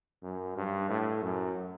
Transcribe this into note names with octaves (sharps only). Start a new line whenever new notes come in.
F#2
G2
A2
F#2